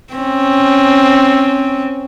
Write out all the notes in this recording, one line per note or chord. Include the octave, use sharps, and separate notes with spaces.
C4 C#4